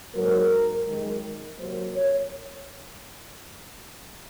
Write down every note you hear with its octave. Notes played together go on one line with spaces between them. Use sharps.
G#2 F#3 A#3 A#4
F#2 D#3 G#3
C3 F#3 A#3 C5
C#5